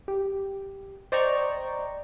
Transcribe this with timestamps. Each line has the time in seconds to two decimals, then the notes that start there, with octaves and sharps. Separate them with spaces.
0.08 G4
1.12 C5 D5 D#5 G5 A#5 C#6